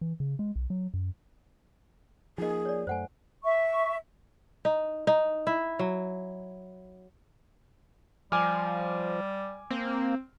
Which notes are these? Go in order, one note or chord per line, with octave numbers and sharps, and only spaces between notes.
E3
C#3
G#3
B1
F#3
F#2
F3 A#3 D#4 G#4 D#5
C#5 D5
F#2 A3 C5 F#5 G#5
E5 C#6
D#4
D#4
E4
F#3
F3 G3 G#5 D6 F6
A#3 C4